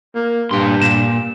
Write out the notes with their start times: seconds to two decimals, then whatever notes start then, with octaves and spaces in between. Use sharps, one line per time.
0.15 A#3
0.51 G2 A#2 C6
0.82 A#2 E7